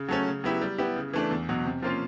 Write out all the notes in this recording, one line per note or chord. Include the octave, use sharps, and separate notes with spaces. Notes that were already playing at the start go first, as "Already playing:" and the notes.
Already playing: C#3
F#3 A3 C#4
C#3
F#3 B3 E4 G4
G3
B3 E4 G4
C#3
E3 A3 D4
E2
B2 F#3
C3
F3 A#3 C#4 F4